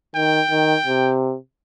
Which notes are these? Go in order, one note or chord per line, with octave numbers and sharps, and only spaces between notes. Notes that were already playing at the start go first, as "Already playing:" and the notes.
D#3 G5
D#3
C3